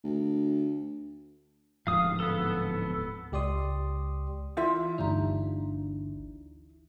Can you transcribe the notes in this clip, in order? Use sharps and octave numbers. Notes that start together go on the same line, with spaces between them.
D2
D1 G#2 F3 F5 D#6
B3 A4
C#2 G4 D5 C6 D#6
E3 E4 F4 E5 C6
G1 D2 D4 D#4 G4 A#5